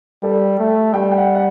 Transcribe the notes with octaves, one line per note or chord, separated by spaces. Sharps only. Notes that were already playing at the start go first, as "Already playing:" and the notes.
G3 A4
A3
G3 G5
G5
F#5
F#5